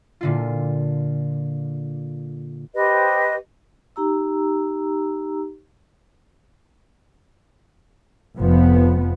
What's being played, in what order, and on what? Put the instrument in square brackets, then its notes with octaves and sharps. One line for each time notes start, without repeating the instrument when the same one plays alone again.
[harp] A#2 D3 F4
[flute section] G4 B4 C5 D#5
[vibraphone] D#4 G4 A#5 E6
[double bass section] F1 F3 B3